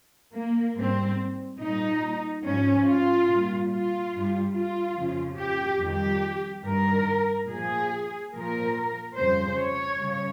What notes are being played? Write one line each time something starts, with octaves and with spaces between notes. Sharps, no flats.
A#3
G#2 G3 C4
A#2 G3 D#4
G#2 F3 C#4
F4
A#2 G3
F4
G2 G3
F4
F2 C#3 F3
G4
F2 D#3 G3 G4
G2 D#3 G3 A#4
A#2 F3 G#4
A#2 F3 A#4
F2 C#3 G3 C5
C#5
C#3 G3